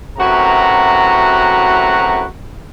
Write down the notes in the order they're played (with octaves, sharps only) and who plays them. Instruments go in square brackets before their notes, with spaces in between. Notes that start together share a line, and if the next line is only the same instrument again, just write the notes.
[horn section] F#2 A2 C3 F#4 B4 A#5